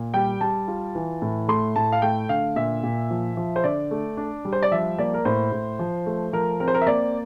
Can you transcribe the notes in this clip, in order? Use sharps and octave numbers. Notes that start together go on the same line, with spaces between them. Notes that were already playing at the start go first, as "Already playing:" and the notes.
Already playing: A#2
G3 G5
G3 A5
F4
E3
A2
A3 C6
A2 A5
F5
A3 G5
D3 F5
A#2 E5
A#2
F3
F3
C5
D3 D5
A3
D4
G3
C5
D5
F3 E5
A#3 D5
A#4
A2 C5
A2
F3
A3
F3 A#4
C4 A#4
C5
A#4
E5
A#3 D5